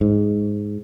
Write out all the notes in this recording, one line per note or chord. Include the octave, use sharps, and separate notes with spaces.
G#2